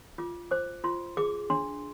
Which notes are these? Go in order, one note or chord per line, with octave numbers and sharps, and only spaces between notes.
F4 D6
C5 D6
F4 C6
G#4 D6
D4 C6